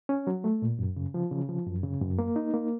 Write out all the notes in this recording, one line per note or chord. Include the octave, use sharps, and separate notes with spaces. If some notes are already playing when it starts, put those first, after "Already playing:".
C#4
F#3
A3
A#2
F#2
C#3
F3
C#3
F3
F#2
C#3
F#2
A#3
D#4
A#3